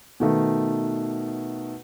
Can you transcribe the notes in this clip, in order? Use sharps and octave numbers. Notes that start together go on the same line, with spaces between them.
B2 D#3 A3